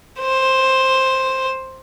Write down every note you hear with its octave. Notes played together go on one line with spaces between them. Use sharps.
C5